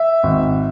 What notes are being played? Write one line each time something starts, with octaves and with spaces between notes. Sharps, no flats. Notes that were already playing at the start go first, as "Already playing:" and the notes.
Already playing: E5
G#1